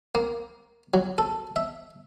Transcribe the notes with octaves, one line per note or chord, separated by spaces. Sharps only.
A#3
F#3
A4
E5